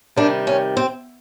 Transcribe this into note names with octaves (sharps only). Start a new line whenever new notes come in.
C3 D#3 G3 D4
C#4
C4